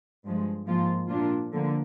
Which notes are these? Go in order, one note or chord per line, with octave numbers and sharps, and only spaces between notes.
G2 F3 G#3
G#2 F3 A#3 F4
A#2 F3 A#3 D4 F4
D3 F3 A#3